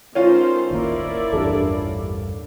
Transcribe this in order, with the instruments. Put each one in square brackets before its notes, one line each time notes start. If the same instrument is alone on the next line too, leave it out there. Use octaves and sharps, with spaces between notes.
[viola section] D#3 A3 C5 [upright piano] C#4 F4
[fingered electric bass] D#1 G#1 A#3 [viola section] E4 A#4 D5
[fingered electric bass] A1 E2 G2 [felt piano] D4 G4 A4